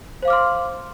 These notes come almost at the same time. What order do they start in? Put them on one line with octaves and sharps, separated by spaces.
C5 F5 D6 F6 C6